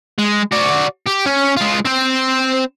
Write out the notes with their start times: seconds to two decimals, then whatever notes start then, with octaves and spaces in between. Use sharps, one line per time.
0.18 G#3
0.52 F#4 D5
1.06 G4
1.26 C#4
1.57 G#3 F4
1.85 C4 C5